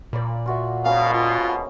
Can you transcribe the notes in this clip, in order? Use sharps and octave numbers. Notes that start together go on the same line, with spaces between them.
A#2 D5 B5
F4 F#4 E5
G#1 B2 A#3 C#4 F5
F4